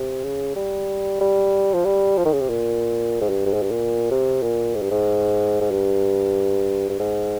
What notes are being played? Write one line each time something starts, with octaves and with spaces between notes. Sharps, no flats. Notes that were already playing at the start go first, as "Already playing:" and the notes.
Already playing: C3
C#3
G3
G3
F3
G3
F3
D#3
C#3
C3
A#2
G#2
G2
G2
G#2
G2
A#2
C3
A#2
G#2
G2
G#2
G#2
G2
G2
G#2